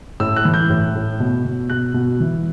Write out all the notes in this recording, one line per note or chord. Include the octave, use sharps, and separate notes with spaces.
A2 E6
F#6
E3
G6
A2
A2
B2
B2
B2 F#6
B2
E3